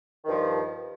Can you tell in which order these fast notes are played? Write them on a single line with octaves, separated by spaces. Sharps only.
D#3 G2 F3